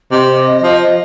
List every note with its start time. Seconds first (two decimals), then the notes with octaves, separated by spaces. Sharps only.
0.11 C3 D#5
0.63 F3